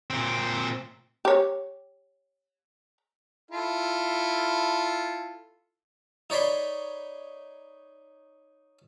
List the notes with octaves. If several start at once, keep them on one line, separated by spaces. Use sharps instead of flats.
A#2 C4
G4 C#5
E4 F4 A4
D#4 C#5 D5 B5 C6